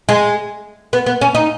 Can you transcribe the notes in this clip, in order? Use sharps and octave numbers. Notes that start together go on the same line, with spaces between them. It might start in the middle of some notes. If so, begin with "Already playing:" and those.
G#3
B3
B3
C#4
D#4